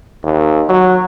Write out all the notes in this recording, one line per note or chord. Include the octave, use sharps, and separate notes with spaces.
D#2
F#3